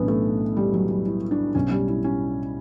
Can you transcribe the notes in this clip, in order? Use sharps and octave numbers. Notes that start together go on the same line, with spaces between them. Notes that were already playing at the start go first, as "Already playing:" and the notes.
Already playing: B1 A2 E3 B3 C#4 D4
A3
G3
F#3
G3
E4
D4
B1 B2 C#4
G3
E4
C#4